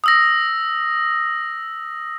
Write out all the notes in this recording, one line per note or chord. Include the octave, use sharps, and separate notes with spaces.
D#6 E6 A#6